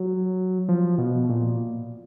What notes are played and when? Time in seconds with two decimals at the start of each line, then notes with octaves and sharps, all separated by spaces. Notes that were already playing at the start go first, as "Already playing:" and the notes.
Already playing: F#3
0.69 F3
0.98 B2
1.29 A#2